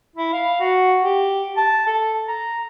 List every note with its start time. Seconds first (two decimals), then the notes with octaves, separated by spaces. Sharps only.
0.16 E4
0.33 F5
0.60 F#4
1.02 G4
1.57 A5
1.87 A4
2.28 A#5